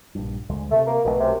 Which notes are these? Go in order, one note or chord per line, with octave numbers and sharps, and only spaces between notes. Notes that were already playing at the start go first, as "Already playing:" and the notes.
A#1 G2
D2 D3 G#3
C3 A3
A#3
B1 B2 D#3 A3
F#2 C3